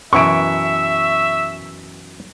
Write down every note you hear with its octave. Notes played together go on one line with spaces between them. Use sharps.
F#2 B2 E3 E5 C#6 D7